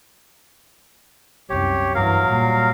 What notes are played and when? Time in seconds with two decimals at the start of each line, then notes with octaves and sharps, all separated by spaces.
1.50 C2 F#2 G4 C#5
1.95 G2 E3 F#3 A#4 F5
2.26 A#2 G3